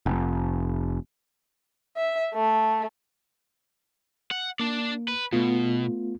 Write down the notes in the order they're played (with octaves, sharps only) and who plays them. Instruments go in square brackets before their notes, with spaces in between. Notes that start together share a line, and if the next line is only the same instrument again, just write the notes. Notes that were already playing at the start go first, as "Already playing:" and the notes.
[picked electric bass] F1
[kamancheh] E5
A3
[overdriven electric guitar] F#5
[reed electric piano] A#3 [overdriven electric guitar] D4 D5
[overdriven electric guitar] B4
[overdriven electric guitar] B2 [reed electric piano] A3 B3 F4